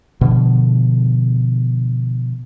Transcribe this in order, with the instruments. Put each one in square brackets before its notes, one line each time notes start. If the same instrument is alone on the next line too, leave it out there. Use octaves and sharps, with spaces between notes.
[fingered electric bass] B2 D3 F3